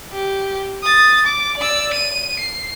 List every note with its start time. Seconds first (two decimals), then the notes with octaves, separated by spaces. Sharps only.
0.12 G4
0.83 D#6 A6
1.26 D6
1.57 D5 E6
1.93 D#7
2.40 C7